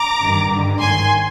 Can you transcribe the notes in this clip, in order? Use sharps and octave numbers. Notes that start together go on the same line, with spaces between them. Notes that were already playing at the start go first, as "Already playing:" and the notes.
Already playing: A#5 D6
G2 D#3
G2 D3
G#2 D#3 G#5 C6